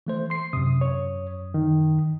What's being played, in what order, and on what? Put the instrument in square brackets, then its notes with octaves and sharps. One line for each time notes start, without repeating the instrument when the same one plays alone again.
[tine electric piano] E3 A3 C5
C6 C7
[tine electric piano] F#2 D#6 [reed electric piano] C3
[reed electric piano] C#5
D#3